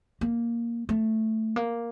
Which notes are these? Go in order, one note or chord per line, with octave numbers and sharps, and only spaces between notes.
A#3
A3
A#3